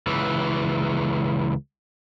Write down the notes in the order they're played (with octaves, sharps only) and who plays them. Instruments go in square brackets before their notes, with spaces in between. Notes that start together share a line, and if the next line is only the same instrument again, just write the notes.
[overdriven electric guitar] C#2 E3